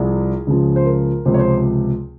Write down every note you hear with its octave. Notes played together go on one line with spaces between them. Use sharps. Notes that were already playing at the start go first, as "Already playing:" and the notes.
Already playing: C2 C3 F3 G#4
C#2 C#3 F3
C5
A#4
C#2 C3 F3 C5
C#5
C5